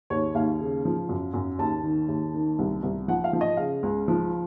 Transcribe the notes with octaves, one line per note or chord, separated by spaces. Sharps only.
D#2 C#5
D#2 F5
C#3
F3
F#2
F#2
D#2 A5
D#3
D#2
D#3
C2
C2
F3 F#5
F5
F3
D#5
C#3 F5
C#2
F3